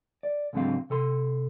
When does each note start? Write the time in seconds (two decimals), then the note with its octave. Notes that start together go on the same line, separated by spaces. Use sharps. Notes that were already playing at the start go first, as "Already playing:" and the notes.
0.23 D5
0.53 C#2 G#2 D3 F#3 C4 F5
0.90 C3 A4 C6